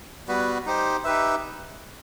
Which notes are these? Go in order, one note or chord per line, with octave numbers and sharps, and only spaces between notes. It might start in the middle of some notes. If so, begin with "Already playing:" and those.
G3 B3 F#4 B4
D#4 G4 C5
D#4 G4 B4 E5